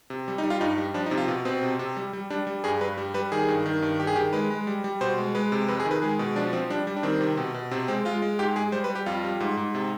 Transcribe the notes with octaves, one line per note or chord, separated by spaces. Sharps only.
C3
G3
D#4
G3
F4
G2 D#4
G3
F3 D4
D#4
C3
F4
B2
B2 C4
C3
C3
G3
G3
G3 D4
G3
G2 G#4
G2 B4
G3
G3 B4
D#3 G#4
G2
D#3
G2
D#3 G4
G#4
D#3 G4
G#3 B4
G#3
G3
G3
B2 C5
G#3
G#3 B4
C3
F2 B4
G#4
D#3
B4
G#3 G#4
B2
F3 D4
F3 C4
G3 D4
G3
D4
D#3 C4
C3
B2
B2
C3 C4
G#3 C4
G#3 F4
G#3
G#2 G4
G#3 G#4
G3 C5
B4
G3
G4
F2 F4
G3
G#2
G#2
C3